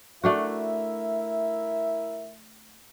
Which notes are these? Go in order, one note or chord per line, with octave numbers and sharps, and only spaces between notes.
A3 D4 E4 F#4 A#4 E5